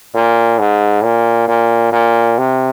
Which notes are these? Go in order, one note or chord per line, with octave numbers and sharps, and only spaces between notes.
A#2
G#2
A#2
A#2
A#2
C3